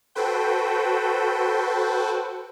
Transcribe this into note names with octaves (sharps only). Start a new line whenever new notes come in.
F#4 A4 B4 C5 G5